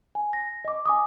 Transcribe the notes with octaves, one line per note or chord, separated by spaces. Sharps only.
G#5
A#6
D#5 D6
G#5 D6 D#6